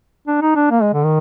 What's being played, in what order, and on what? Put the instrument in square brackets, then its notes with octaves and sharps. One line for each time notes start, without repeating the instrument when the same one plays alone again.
[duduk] D4
D#4
D4
A#3
G#3
D3
D#3